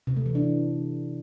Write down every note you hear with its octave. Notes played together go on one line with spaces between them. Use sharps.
C3
A3
E3
D4